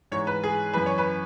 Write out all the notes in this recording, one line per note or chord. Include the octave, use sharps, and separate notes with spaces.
G#2 E3 C#5
B4
G#4
F#2 E3 B4
C#5
B4